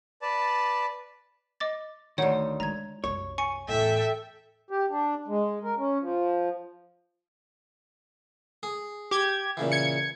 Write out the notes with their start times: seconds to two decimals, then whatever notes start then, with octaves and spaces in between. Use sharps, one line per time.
0.22 B4 D5 A5
1.60 D#5 D6 A6
2.18 D2 D#3 C#5 F#5
2.60 G#3 A#5 G#6
3.04 C2 F#2 C#5
3.38 G#5 C#6 C#7
3.68 E2 A2 A4 E5 G5
4.71 G4
4.91 D4
5.28 G#3
5.63 A#4
5.78 C#4
6.01 F3
8.63 G#4
9.11 G4 G#6
9.57 A#2 C#3 E3
9.72 G#6 C#7